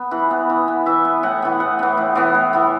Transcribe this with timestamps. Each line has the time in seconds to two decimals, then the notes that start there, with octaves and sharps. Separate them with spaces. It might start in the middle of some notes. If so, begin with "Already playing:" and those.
Already playing: B3
0.11 E3 B4
0.31 B3
0.50 E3
0.68 B3
0.86 E3 E5
1.05 B3
1.23 A2 F#5
1.42 E3 B3
1.60 A2 F#5
1.79 E3 B3
1.97 A2
2.15 E3 B3
2.35 A2
2.53 E3 B3